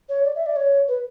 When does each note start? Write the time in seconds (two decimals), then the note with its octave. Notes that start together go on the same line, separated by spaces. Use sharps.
0.09 C#5
0.25 D5
0.36 E5
0.46 D5
0.56 C#5
0.88 B4